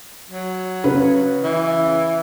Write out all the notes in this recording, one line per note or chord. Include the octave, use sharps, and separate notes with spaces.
F#3
C#3 B4
E3